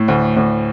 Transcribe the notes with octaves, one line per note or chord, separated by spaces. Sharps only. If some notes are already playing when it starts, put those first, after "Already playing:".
Already playing: A2
D2
D2